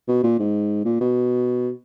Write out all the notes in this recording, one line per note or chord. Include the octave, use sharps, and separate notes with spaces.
B2
A#2
G#2
A#2
B2